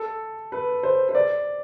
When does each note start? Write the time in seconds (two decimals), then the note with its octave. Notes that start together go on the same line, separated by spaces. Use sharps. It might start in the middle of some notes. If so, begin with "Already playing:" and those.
Already playing: A4
0.52 B4
0.83 C5
1.09 C5
1.15 D5